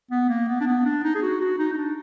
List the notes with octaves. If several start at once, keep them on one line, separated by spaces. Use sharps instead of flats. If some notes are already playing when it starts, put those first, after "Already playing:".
B3
A#3
B3
D4
B3
D4
D#4
G#4
F#4
F#4
D#4
D#4
D4